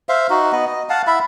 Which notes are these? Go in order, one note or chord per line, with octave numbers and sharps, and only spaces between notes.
C5 E5 F5
D#4 F#4
B3 D#5
D#5
F5 F#5 A5
E4 E5 B5